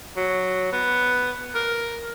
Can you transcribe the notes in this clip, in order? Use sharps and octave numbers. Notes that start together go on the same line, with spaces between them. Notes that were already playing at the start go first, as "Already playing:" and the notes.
F#3
B3
A#4